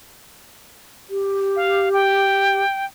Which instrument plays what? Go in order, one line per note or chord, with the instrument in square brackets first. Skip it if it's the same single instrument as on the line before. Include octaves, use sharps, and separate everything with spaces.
[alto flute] G4
[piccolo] F5
G5